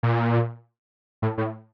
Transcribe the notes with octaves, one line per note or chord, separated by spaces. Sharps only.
A#2
A2
A2